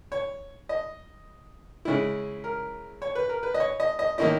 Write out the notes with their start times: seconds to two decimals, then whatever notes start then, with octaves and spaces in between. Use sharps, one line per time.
0.12 C#5
0.69 D#5
1.85 C#3 G#3 C#4 E4
2.44 A#4
3.02 C#5
3.15 B4
3.29 A#4
3.43 B4
3.54 D#5
3.60 C#5
3.80 D#5
3.99 D#5
4.18 D#3 A#3 C#4 E4 D#5